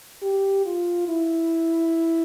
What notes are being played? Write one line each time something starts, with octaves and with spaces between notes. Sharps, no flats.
G4
F4
E4